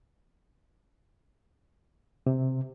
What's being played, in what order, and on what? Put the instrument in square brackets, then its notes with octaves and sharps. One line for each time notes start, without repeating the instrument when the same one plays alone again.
[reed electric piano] C3